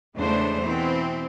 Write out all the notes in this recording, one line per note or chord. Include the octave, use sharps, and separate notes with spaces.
E2 C#3 G#3 A3 D4 C5
B2 E3 C4